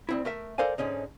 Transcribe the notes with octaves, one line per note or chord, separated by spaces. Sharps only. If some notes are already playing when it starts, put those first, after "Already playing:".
D2 C4 E4
A3 A#4 E5
A4 A#4 C5 D5 F5 G#5
G#2 D3 C#4 D#4